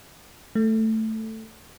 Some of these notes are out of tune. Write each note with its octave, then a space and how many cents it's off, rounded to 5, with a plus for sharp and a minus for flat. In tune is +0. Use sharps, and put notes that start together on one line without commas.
A3 +5